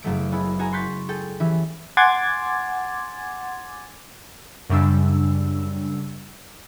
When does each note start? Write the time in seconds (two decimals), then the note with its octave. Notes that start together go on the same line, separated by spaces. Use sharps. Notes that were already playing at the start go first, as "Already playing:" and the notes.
0.03 F#1 F#3 A3 D7
0.31 G#3 B3 E4
0.59 F#4 G#4 G#5 A#5
0.73 C6 C#6 F#6 G6 A6 B6
1.08 G#4 A4 G5
1.40 E3 C#4 G4 E5
1.97 F#5 G#5 C6 D6 G#6 A6
4.70 F#2 C#3 G3 D4 E6